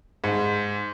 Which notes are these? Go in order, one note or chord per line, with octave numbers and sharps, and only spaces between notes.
G#2